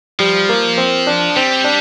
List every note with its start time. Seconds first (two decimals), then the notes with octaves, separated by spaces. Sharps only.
0.19 F3 G3
0.49 A#3
0.78 C4
1.07 D4
1.36 G3 C4
1.65 D4